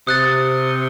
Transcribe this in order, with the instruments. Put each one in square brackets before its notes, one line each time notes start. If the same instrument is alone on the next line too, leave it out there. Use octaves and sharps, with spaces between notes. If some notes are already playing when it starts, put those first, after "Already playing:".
[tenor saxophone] C3 [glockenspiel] D#6 F#6 A6